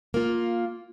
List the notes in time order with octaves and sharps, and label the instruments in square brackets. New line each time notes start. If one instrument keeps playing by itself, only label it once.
[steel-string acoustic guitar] A#3 F4